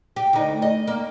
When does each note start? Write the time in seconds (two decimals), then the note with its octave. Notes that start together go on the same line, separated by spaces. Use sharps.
0.16 G4
0.33 D2 D#4
0.62 D#5
0.87 A#3